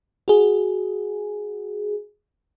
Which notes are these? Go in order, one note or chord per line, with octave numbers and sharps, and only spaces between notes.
F#4 G#4